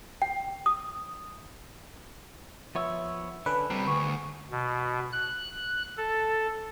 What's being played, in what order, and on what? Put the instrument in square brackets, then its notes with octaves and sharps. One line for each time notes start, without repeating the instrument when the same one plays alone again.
[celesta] G5
D#6
[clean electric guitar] F3 B3 C#5 [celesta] E5 E6
[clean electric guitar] D3 C#4 D4 [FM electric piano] B4
[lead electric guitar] G3 C4 [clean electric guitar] D4 G4 A#4
[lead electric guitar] D2 [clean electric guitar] B3 G#4 [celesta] C#6
[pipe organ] B2
F#6
A4